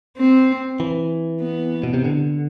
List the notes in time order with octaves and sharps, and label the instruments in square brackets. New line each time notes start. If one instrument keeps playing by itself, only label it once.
[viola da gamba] C4
[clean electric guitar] E3
[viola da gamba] B3
[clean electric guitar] B2
C3
D3